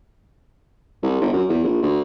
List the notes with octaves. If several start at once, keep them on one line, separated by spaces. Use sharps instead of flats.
C2
G1
F#2
E2
A#1
D2